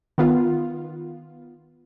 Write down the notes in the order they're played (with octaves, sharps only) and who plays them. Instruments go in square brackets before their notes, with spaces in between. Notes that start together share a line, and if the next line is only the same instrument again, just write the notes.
[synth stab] D#3 B3 F4